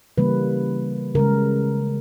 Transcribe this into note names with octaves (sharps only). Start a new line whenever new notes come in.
C#3 E3 G3 A#3 B4
C#3 G#3 A#4